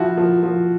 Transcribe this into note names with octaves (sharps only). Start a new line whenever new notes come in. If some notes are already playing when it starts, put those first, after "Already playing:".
Already playing: F3 E4 F#4
F3
F3